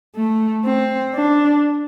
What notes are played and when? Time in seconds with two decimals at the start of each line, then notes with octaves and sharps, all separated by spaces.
0.16 A3
0.65 C4
1.15 D4